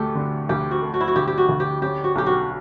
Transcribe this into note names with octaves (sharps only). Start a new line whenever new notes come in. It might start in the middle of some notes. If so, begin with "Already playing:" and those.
Already playing: D2 F#3 A3 G4 A4
D3
D2 G4
F#4
A3
F#4
E4
F#4
D2 G4
G4
F#4
D2
G4
C#4 G4
F#4
B1 G4
F#4